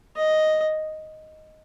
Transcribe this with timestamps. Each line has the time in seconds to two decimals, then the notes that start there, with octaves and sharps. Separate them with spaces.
0.17 D#5